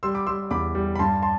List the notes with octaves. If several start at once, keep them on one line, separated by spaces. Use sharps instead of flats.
G3 C6 E6
B5 D6
G3 C6 E6
E2 B5 D6
G3
B5
G2 A5 C6
A5 C6